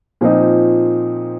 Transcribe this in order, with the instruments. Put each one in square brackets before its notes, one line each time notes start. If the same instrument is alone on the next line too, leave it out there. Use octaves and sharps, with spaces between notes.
[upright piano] A#2 F3 C4 D#4